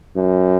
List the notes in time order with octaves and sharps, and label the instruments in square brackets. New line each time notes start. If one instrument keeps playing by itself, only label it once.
[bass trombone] F#2